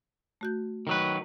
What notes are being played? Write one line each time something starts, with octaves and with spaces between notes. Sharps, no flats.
A3 F#4 G6
D#3 F#3 B4